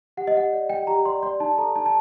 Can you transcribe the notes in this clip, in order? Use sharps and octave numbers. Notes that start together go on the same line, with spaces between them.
G4 F#5
D#5
G4 F#5
D5
G4 G5
G4 A#5
D5 C6
D5 C6
D#4 A5
A4 A#5
D#4 A5
A5